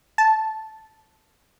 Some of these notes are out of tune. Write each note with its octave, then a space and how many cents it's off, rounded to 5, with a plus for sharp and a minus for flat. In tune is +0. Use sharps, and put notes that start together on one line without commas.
A5 -10